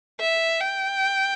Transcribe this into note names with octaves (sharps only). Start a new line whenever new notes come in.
E5
G5